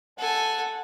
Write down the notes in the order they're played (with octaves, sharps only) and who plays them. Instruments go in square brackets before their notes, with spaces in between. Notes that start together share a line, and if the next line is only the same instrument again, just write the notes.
[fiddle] A4 G#5 [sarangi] F#5